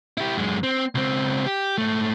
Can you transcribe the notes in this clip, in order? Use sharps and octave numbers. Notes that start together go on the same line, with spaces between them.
E4 G4
F#2 G#3
C4
C#2 C4
G4
G#2 A3